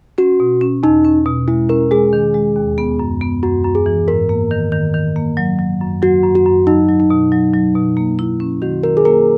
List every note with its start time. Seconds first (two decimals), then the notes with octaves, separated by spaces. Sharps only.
0.18 C#4 F#4
0.40 B2
0.61 C#4
0.83 E2 D#4
1.04 C#4
1.26 B2
1.48 G#3 E4
1.69 C#4 A#4
1.91 G#3 G#4
2.13 D#3
2.34 G#3
2.56 D#2
2.78 B3
2.99 F#2
3.21 B3
3.43 F#2 F#4
3.64 F#2
3.75 G#4
3.86 E3
4.08 G#2 A#4
4.29 A#3
4.51 D#3
4.72 D#3
4.94 D#3
5.16 A#3
5.37 F#3
5.59 F#3
5.81 F#2
6.02 F#3 F#4
6.24 F#2
6.35 F#4
6.45 F#2
6.67 F#3 D#4
6.89 F#3
7.00 D#4
7.10 B2
7.32 F#3
7.54 F#3
7.75 B2
7.97 A#3
8.19 E4
8.40 C#4
8.62 D#3 F#4
8.83 D#3 A#4
8.97 G#4
9.05 A#3 A#4